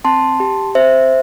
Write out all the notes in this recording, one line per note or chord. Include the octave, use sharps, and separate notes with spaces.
C4 A5 C6
G4
C4 C5 E5